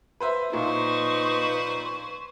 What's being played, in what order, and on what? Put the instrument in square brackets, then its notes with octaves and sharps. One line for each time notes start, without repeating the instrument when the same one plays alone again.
[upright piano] B4 C5 E5
[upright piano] A#2 [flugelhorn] D#4 [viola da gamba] B4 C5 [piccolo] C#6